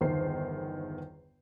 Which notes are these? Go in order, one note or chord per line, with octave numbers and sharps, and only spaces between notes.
G1 E2 D#3 C5 C7